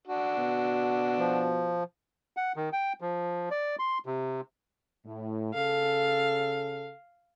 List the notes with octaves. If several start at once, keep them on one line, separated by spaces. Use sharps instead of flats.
D4 F#4
B2
F3
F#5
D#3
G5
F3
D5
C6
C3
A2
C#3 A4 F5